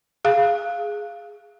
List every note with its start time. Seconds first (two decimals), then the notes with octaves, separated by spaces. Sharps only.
0.25 G#4 F5